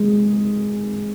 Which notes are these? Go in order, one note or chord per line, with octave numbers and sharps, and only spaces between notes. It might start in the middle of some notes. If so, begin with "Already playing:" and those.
Already playing: G#3